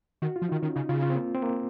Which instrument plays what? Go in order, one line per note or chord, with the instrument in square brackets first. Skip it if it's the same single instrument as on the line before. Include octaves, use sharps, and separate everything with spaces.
[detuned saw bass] D#3 [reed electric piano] F#4
[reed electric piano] F4
[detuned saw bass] F3
[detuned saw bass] D#3 [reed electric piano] D#4
[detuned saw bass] D#3 [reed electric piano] C#4
[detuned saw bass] C#3 [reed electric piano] D#4
[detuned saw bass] C#3 [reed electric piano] F4
[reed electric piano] F4
C4
A#3
C4
A#3